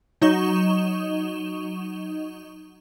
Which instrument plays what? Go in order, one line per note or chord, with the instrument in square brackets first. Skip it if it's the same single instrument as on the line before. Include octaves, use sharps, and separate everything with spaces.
[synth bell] F#3 D#4 D#5 C#6 E7 G7